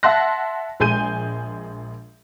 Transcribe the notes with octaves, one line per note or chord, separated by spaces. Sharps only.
E5 F#5 A5 C6 F#6 A#6
A#1 G#3 G#5 G6 D#7